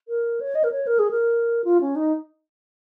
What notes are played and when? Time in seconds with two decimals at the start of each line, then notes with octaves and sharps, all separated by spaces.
0.08 A#4
0.41 C#5
0.55 D#5
0.64 A#4
0.72 C#5
0.87 A#4
0.99 G#4
1.11 A#4
1.64 F4
1.81 C#4
1.96 D#4